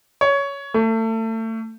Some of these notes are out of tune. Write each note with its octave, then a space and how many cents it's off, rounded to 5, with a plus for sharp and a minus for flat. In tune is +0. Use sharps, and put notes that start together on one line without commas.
C#5 +15
A3 +30